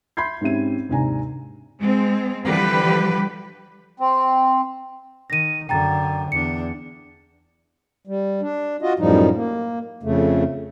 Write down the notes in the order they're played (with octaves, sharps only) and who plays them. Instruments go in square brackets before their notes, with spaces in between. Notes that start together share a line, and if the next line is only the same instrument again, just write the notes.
[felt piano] E5 B5 C6 G6 G#6 C7
G#2 C4 C#4 G4 E5 D#7
D#2 G#2 C3 D4 G#5 A#5
[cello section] G#3 C4
D3 E3 F3 G3 G4 B4
[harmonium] C4
[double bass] D#3 [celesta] A#6 D#7
[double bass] F#2 D3 [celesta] G5 A#5 A6
[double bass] E2 D4 [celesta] C#7
[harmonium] G3
D4
F4 F#4 D#5
F#2 A2 F3 G3 D#4
A#3
F2 C#3 A3